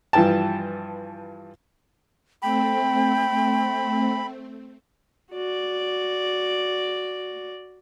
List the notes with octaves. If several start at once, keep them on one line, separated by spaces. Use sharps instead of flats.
G2 E3 F3 G5 A5
A3 C4 G5 B5
F#4 D5